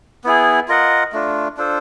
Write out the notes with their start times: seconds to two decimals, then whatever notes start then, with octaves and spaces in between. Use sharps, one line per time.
0.24 B3 E4 G#4
0.68 F4 A#4 D#5 F#5
1.13 A3 D4 F4
1.57 D4 F4 A4 C5